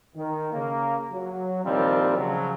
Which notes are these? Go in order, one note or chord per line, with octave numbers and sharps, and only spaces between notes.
D#3
C#3 A#3
F#3
C2 A#2 D#3 F3 G3 C4
C#3 F3 F#3